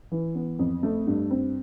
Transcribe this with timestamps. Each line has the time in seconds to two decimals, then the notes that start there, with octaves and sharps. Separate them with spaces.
0.12 E3
0.35 B3
0.59 F2
0.83 A3
1.07 G2
1.31 C4